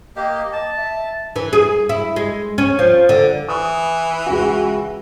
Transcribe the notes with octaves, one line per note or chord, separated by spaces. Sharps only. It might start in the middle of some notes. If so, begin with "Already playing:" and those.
A#3 G4 D#5
A5
E5
E3
G#4
E4
G#3
C#4
F3
D3
E3 D#6
C#2 F#4